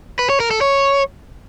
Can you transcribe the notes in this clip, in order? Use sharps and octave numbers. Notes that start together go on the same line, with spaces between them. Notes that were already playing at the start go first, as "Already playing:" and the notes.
B4
C#5
A#4
A4
C#5